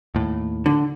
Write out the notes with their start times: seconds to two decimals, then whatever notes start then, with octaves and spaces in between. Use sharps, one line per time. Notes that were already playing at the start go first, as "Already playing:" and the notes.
0.15 D#2 A2
0.66 D3